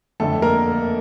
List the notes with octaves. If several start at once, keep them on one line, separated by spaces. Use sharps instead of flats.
G1 F2 D3 A3 A4
A#3 A#4